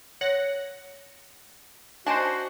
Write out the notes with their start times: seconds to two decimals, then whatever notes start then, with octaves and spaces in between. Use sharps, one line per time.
0.21 C#5 F#5 A#6
2.06 D4 D#4 F#4 C5 G#5 A5